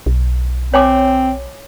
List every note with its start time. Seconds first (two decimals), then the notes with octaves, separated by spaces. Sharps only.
0.06 B1
0.74 C4 C#5 G#5 D6